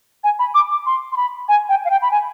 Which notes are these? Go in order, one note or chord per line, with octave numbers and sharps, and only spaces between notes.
G#5
B5
D6
D6
C6
C6
B5
G#5
G5
F5
G5
B5
G#5